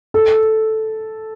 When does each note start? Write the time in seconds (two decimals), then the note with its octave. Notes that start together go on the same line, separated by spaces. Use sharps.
0.14 A4